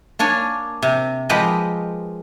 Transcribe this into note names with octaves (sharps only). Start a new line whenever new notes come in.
A#3 D4 C#5 G#5
C3
F3 G#3 G4 A#4 B4 D#5